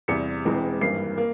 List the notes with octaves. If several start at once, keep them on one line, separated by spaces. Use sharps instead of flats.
E2 C3 G3 C#7
E1 E2 E3 G#3 C4
G#1 G2 E3 A#3 C7
A#3